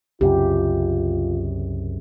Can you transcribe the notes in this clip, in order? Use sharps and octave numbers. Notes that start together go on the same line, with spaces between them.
C2 F#2 C#3 F4 G4